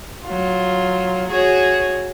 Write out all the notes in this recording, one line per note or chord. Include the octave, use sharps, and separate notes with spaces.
F#3 F4
F#4 G#4 C#5